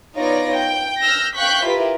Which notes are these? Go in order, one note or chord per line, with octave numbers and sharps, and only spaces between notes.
B3 D#4 F4 C#5 D5 A#6
G5
E6 F6 G6 A#6
F5 G5 C#6 F#6 G6 B6
E4 F4 G4 A#4 B4